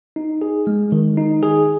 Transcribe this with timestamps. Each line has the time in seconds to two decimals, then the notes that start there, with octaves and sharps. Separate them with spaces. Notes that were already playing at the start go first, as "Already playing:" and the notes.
0.16 D#4
0.42 G#4
0.67 G#3
0.92 D#3
1.17 D#4
1.43 G#4